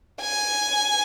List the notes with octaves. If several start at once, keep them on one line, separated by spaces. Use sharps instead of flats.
G#5